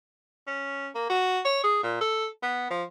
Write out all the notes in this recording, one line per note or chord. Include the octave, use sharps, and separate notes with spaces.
C#4
A#3
F#4
C#5
G#4
A#2
A4
B3
F3